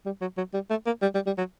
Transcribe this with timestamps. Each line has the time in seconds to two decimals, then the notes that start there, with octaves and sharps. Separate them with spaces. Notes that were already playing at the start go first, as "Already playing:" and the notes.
0.05 G3
0.21 F#3
0.37 F#3
0.54 G3
0.70 A3
0.86 A#3
1.02 G3
1.14 G3
1.26 G3
1.38 F#3